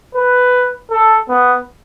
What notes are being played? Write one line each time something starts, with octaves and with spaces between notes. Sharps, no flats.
B4
A4
B3